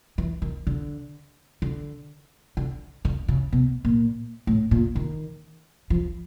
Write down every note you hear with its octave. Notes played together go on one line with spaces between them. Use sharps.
E3
D#3
D3
D3
D3
D3
C#3
B2
A#2
A2
A#2
D#3
F3